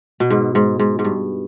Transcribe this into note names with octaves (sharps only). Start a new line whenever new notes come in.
B2
G#2
G#2
G#2
G#2
G2